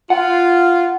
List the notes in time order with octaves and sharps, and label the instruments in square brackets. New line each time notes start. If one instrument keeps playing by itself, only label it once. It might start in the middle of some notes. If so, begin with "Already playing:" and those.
[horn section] F4 [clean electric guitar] F#5